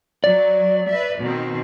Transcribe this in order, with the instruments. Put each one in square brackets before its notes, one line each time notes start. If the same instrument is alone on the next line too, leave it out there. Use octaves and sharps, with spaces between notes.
[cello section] F#3 [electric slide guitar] D5
[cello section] B4 E5
B2 D#3 C4